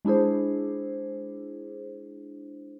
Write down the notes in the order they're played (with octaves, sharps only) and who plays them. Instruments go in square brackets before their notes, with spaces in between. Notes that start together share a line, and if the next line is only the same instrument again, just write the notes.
[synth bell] G#3 D4 E4 G#4 C5